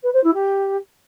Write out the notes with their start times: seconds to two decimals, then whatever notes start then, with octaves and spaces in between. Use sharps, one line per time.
0.03 B4
0.13 C5
0.23 E4
0.34 G4